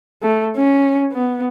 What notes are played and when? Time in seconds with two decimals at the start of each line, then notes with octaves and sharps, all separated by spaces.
0.22 A3
0.56 C#4
1.12 B3